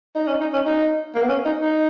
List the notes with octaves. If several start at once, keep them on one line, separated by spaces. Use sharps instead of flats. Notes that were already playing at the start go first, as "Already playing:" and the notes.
D#4
C#4
D#4
C#4
D#4
A#3
B3
C#4
D#4
D#4